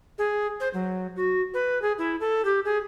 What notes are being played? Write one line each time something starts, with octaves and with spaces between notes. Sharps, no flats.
G#4
C5
F#3
F#4
B4
G#4
E4
A4
G4
G#4